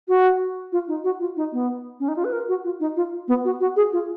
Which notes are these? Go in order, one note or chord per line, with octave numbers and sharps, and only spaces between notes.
F#4
F4
D#4
F#4
F4
D#4
B3
C#4
D#4
F4
B4
A#4
F#4
F4
D#4
F4
B3
F#4
F#4
G#4
F4